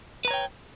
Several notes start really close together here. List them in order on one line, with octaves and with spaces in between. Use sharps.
B4 A#5 C#5 G5